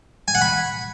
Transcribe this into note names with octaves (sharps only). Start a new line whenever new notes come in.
G#5
F#5
B5